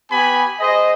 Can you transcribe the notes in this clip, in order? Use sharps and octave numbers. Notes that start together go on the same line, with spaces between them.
B3 G4 G#5 B5
G#4 C5 D#5